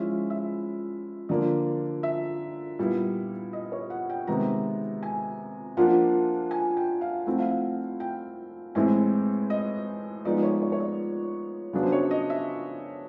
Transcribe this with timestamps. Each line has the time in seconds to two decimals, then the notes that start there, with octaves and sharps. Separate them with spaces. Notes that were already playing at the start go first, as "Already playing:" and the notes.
Already playing: F3 G#3 C#4 E4 E5
0.30 E5
1.29 D3 F3 A#3 D5
2.03 E5
2.79 A#2 G3 B3 E4
3.53 D#5
3.72 C#5
3.90 F#5
4.10 G5
4.27 C3 D#3 G#3 B3 A#5
5.03 G#5
5.77 F3 A#3 D4 F4 F#5
6.51 G#5
6.77 G5
7.01 F5
7.26 F3 A3 C4 E4 F#5
7.39 F5
7.50 F#5
8.00 G5
8.75 A2 E3 G#3 C4 E4 G#5
9.50 D#5
10.25 F3 G#3 B3 D#4 D5
10.43 C#5
10.62 C#5
10.72 C#5
10.80 D5
11.73 C#3 F#3 B3 D4
11.83 C5
11.92 C#5
12.11 D#5
12.30 E5